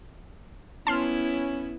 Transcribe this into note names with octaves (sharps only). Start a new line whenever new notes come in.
B3 C#4 E4 A5 C6 F6